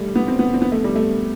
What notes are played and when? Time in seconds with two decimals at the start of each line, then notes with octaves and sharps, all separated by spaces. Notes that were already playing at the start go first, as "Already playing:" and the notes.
Already playing: G3 A3
0.15 B3
0.28 C4
0.39 B3
0.54 C4
0.62 B3
0.72 A3
0.84 G3
0.96 A3